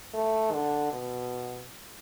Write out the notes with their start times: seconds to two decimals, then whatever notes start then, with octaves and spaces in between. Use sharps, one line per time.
0.14 A3
0.53 D3
0.92 B2